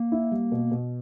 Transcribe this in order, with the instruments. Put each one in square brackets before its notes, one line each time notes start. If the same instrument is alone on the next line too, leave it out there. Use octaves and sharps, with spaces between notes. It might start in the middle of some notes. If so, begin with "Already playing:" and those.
Already playing: [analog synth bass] A#3
[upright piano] E4
G3
B2
B2